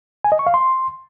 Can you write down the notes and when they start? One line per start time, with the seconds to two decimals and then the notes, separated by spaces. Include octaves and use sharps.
0.24 G#5
0.32 D#5
0.39 C#6
0.47 F5
0.54 C6